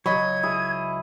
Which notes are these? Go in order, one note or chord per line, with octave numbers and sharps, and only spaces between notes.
C#2 F#3 D#5 B5 C#6 G#6
E4 G#4